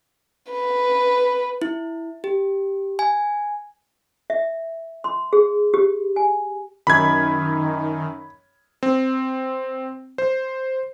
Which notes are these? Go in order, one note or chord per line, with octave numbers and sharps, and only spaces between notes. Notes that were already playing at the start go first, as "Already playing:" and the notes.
B4
E4
G4
G#5
E5
C6
G#4
G4
G#5
F#2 D#3 B5 G#6
C4
C5